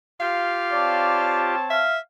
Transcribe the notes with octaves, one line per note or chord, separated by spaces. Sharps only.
F4 G4 F5
C4 C#5 D5 A5
E5 F5